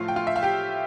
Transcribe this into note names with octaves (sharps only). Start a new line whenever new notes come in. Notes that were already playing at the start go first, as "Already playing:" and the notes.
Already playing: A2 F3 A3 F4 F5
G5
F4 F5
E5
F5
G4 G5